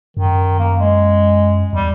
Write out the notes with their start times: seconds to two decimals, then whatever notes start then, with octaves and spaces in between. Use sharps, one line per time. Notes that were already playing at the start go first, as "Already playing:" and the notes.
0.17 F#2 D#3
0.59 A#3
0.80 G#3
1.73 E2 G3